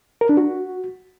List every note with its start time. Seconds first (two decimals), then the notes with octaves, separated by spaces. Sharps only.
0.21 A#4
0.29 D4
0.37 F#4